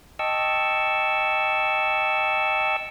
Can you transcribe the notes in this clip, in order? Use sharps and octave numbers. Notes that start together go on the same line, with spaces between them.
D#5 G5 A5 C#6 E6